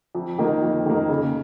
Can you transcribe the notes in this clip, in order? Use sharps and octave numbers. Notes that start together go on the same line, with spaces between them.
F2
D#3 A#3
F2
D#3 A#3
C#3